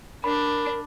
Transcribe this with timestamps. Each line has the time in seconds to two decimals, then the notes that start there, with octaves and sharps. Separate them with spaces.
0.24 D4 A#4 B5